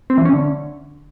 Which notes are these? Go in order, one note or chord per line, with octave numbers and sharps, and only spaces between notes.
C4
E3
C#4
D3